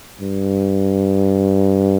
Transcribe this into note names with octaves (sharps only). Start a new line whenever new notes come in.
G2